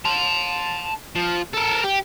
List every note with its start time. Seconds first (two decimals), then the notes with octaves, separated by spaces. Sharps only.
0.05 A5 C6
1.15 F3
1.54 A4 A#4
1.84 G4